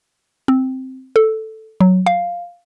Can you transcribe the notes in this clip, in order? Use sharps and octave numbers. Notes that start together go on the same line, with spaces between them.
C4
A4
F#3
F5